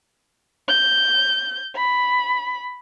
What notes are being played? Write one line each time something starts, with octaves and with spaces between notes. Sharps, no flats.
G6
B5